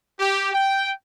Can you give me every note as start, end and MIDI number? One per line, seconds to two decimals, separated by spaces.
0.20 0.52 67
0.53 0.91 79